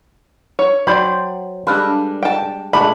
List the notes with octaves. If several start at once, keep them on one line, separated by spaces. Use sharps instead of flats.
C#5
F#3 C5 D5 G5 B5
G3 G#3 D4 A4 B4 F5
G5 A5
A#2 G#3 A3 D4 B5